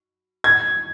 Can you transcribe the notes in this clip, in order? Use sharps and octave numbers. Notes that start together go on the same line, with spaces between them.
G#6